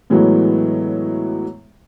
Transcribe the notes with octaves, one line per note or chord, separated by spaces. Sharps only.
A2 E3 F#3 G#3 A3 B3